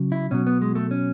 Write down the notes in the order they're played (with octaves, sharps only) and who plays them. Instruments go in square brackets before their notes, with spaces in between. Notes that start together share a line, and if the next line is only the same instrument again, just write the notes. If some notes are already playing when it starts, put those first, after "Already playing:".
Already playing: [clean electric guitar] C#3 F#3
E4
B2 F#3 C#4
B3
G#3
A3
C#4